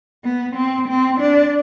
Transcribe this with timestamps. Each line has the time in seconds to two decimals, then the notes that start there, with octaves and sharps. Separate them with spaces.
0.24 B3
0.56 C4
0.88 C4
1.20 D4